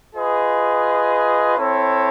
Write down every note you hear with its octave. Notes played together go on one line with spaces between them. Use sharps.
F4 G#4 B4 D#5
C4 E4 A4 C#5